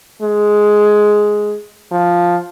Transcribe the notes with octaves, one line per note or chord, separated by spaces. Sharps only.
G#3
F3